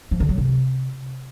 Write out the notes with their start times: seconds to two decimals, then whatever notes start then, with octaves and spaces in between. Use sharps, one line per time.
0.11 F3
0.20 D3
0.29 F#3
0.38 C3